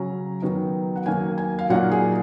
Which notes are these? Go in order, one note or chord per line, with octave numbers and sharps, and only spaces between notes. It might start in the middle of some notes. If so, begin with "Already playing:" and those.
Already playing: C#3 F#3 C#4 A#5
D#3 F#3 B3 D#4
F#5
D#3 F#3 A#3 G#5
G#5
F5
A#2 F#3 A#3 D#4 F#5
G#4